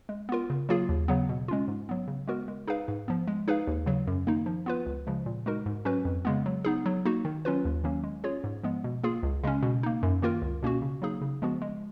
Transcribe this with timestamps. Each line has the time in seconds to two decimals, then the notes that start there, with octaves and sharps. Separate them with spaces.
0.09 G#3
0.29 B3 F4 A#4
0.50 C#3
0.69 F#3 A#3 F4 G#4
0.89 D#2
1.08 C#3 F#3 B3
1.29 B2
1.48 G#3 C#4 F4
1.68 G#2
1.89 F#3 B3
2.08 C#3
2.27 G#3 B3 F#4 A#4
2.48 G#3
2.68 D#4 G#4 B4 F5
2.88 G#2
3.08 F3 B3
3.28 G#3
3.48 D#4 G#4 B4 F5
3.67 D#2
3.86 C#3 F#3
4.07 F#2
4.27 D#3 A#3 D#4
4.46 F3
4.66 B3 F4 B4
4.86 C#2
5.07 C#3 F3 G#3
5.26 A#2
5.46 G#3 D#4 F#4 A#4
5.66 G#2
5.85 F#3 C#4 F#4 B4
6.05 F2
6.25 C#3 G#3 B3
6.46 F#3
6.65 B3 D#4 G#4
6.86 F#3
7.05 A#3 D#4 F#4
7.25 D#3
7.45 F#3 C#4 F4 B4
7.65 D#2
7.84 D#3 F#3 A#3 C#4
8.04 G#3
8.24 C#4 F4 G#4 C#5
8.44 G#2
8.63 F3 G#3 B3
8.84 B2
9.04 A#3 F4 G#4
9.23 C#2
9.44 C#3 G#3 C#4
9.63 B2
9.83 A#3 D#4
10.03 F#2
10.22 D#3 A#3 F4 A#4
10.42 C#2
10.62 B2 A#3 C#4 F#4
10.82 C#3
11.02 F#3 A#3 D#4 G#4
11.21 C#3
11.42 F3 G#3 B3 F#4
11.62 G#3